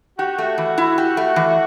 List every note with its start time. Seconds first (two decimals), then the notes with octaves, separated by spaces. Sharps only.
0.19 F#4 G4
0.38 A3
0.58 E3
0.78 E4
0.98 G4
1.17 A3
1.36 E3